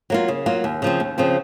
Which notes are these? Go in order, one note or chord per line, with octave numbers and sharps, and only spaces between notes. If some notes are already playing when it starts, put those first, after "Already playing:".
F#3 A#3 F4
C#3
F#3 A#3 F4
D#2
C#3 F3 C4
D#2
C#3 F3 C4